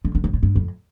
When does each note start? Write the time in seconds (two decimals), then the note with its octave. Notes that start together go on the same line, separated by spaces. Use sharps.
0.05 D3
0.15 D3
0.24 C#3
0.33 A2
0.43 G2
0.55 F2